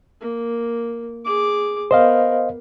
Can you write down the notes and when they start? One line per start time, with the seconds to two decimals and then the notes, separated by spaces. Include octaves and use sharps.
0.21 A#3
1.25 G#4 D6
1.91 B3 A#4 C5 D#5 F5